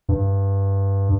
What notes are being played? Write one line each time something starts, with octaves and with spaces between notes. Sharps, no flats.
G2